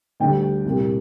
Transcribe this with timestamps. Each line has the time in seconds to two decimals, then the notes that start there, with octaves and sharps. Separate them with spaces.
0.20 D2 D3 G3 G5
0.65 C2 A#2 G3 A#3